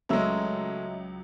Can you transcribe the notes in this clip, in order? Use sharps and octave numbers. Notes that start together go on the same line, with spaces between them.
C#2 F#3 G#3 A3 D#5 E5 E6